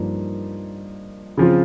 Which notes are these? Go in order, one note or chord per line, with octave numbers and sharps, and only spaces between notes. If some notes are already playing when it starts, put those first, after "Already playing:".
Already playing: G2 F3 A#3 D#4
C#3 F3 C4 F4